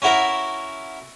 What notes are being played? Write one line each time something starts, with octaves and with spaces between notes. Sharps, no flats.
C#4 E4 F#4 A#4 E5